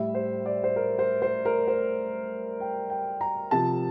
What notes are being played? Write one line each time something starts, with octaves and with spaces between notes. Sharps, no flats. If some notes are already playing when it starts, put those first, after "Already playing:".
Already playing: A2 G3 E5
C5
D5
C5
A#4
C5
C5
A#4
C5
G5
G5
A#5
C3 F3 A5